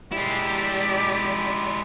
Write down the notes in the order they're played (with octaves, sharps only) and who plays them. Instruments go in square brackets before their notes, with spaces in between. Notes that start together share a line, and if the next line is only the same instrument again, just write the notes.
[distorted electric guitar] G#3 E4 [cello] G4 D5